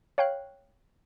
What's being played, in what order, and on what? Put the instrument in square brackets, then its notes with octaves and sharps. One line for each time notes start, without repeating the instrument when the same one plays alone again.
[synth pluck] C#5 F5 G5 B5 F#6